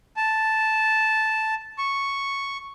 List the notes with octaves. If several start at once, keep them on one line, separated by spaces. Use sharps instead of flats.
A5
C#6